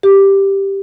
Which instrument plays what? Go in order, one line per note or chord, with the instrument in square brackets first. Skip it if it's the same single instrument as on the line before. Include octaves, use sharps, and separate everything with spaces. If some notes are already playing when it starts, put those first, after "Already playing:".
[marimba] G4